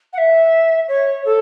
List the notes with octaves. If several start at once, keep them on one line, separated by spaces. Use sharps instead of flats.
F#5
E5
C#5
A4